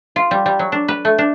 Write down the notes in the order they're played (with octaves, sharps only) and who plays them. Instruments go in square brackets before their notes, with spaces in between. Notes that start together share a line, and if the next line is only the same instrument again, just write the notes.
[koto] F4
G3
G3
F#3
D4
B4
A3
D4